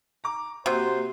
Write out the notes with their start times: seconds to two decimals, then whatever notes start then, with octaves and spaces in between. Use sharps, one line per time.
0.24 A#5 D6
0.66 C3 A#3 F#4 G4 C5